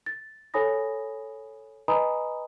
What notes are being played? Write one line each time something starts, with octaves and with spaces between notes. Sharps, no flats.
A6
A4 C#5 G#5 B5 D#6 A#6
B4 D#5 G#5 A#5 B5 D#6